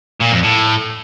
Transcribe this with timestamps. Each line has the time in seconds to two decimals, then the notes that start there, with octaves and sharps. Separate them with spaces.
0.21 A#2
0.33 F2
0.44 A2